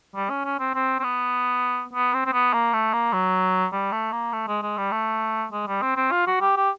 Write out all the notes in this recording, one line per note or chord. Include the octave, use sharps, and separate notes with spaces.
G3
C#4
C#4
C4
C4
C4
B3
B3
C4
C4
B3
A#3
A3
A#3
F#3
G3
A3
A#3
A3
G#3
G#3
G3
A3
G#3
G3
C4
C4
F4
F#4
G4
G4